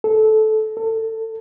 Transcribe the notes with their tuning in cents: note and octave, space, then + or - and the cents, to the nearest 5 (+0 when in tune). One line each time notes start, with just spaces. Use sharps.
A4 -15
A4 +25